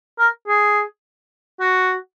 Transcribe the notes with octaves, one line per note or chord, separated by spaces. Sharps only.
A#4
G#4
F#4